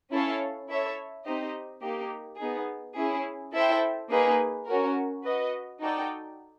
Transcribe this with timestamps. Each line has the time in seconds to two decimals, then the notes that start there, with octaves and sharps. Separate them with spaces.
0.11 C#4 E4 A4 C#5 F5
0.69 E4 A4 C#5 E5
1.26 C4 D#4 G4 C5 D#5
1.83 A#3 D#4 G4
2.39 B3 D#4 G#4
2.97 C#4 E4 G#4
3.53 E4 A4 C5 E5 G5
4.10 A#3 D#4 G#4 B4
4.68 C#4 F#4 A#4
5.24 F#4 B4 D#5
5.81 D#4 F#4 A4 D5 G5